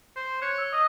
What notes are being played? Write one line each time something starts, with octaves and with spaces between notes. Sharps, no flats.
C5
C#5 F#6
E6 G7
D#5 D#6